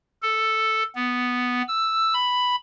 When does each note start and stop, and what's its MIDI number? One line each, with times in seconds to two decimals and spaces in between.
0.22 0.83 69
0.95 1.62 59
1.68 2.14 88
2.14 2.56 83